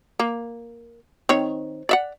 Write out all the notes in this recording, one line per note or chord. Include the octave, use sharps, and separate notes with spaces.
A#3
D#3 C4 C#5
D5 E5 F#5